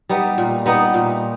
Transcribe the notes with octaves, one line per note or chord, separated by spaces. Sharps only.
G3 B3 D#4
A#2
G3 B3 D#4
A#2